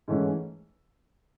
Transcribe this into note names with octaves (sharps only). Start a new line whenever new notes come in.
G#2 E3 A3 C#4